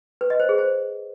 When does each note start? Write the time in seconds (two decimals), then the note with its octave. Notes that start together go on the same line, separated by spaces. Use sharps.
0.21 B4
0.30 D#5
0.40 C5
0.49 G#4
0.58 C5